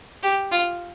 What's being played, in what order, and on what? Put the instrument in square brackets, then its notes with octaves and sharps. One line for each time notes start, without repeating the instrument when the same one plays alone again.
[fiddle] G4
F4